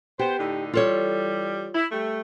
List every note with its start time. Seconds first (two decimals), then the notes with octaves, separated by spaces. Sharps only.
0.19 B3 G4 C5
0.39 A2 D3 D#4
0.73 E3 G3 F4 A4 C#5
1.74 E4
1.91 G3 A3